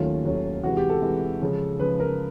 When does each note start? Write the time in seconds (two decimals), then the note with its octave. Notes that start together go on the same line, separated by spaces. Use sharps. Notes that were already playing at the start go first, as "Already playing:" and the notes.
Already playing: D#2 D#3 F#3 A3 C#4 F4
0.24 D#2 D#3 F#3 A3 C#4
0.63 C3 E3 G#3 F#4
0.77 G4
0.90 A4
1.02 C3 E3 G#3
1.42 C#3 F3 G#3
1.80 C#3 F3 G#3 B4
2.00 A#4